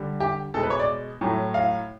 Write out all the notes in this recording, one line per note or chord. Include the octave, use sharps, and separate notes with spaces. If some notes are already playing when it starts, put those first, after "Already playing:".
Already playing: D3 G3
G4
B2 G#3 A4
B4
C#5
D5
A2 F#3 A3
F5